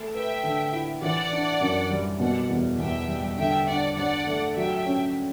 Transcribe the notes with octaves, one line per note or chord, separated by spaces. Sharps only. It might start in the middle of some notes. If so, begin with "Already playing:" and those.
Already playing: A3
B4 E5 G5
D3
E4
E3 D5 F#5
D4
F#2
G3
B2 D5 F#5
E2
E2 E5 G5
G3
D3 E5 G5
D4 D5 F#5
G2 D5 F#5
A3
F#3 E5 G5
C#4